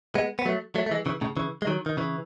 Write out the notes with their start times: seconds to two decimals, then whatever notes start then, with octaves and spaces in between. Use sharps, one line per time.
0.15 G#3 B3
0.39 B3
0.45 F#3 A3
0.75 F#3 A3
0.86 A3
0.91 E3 G#3
1.06 C#3 E3
1.21 A2 C#3
1.37 C#3 E3
1.62 G#3
1.67 D#3 F#3
1.86 D#3
1.97 C#3 E3